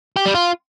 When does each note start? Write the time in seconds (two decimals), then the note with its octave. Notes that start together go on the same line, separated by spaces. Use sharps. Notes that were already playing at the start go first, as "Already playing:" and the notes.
0.16 G4
0.25 G3
0.34 F4